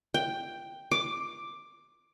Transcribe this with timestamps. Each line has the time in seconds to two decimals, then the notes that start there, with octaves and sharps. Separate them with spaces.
0.14 G5
0.91 D6